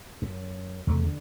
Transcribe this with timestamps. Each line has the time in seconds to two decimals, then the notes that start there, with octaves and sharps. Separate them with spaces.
0.22 F#2
0.87 E2 C3 A3
1.05 D3